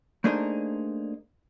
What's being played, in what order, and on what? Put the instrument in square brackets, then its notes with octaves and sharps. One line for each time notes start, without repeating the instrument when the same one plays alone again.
[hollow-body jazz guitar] A3 A#3 D4 D#4 G#4 C5